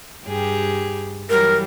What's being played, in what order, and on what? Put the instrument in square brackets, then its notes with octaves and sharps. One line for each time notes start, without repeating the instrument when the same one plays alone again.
[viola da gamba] G2 G4 G#4
[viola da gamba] E3 F#3 G3 [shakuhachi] A#4